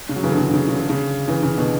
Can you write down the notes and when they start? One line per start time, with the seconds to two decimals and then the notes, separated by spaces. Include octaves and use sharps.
0.09 C#3
0.16 F#3
0.23 C#3 E3
0.32 D3
0.38 C#3
0.48 D3
0.54 C#3
0.69 C#3
0.79 D3
0.90 C#3
1.28 C#3 E3
1.43 C#3
1.58 B2 D3